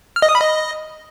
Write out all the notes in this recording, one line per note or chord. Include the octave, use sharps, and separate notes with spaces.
F6
D#5
D#6
B5
D#5